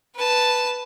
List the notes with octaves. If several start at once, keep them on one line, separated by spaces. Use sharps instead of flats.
B4 A5